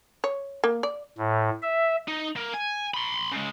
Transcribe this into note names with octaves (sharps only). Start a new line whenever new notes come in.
C#5
A#3
D5
A2
E5
D#4
A#3
G#5
B5 C6
C#3 G#3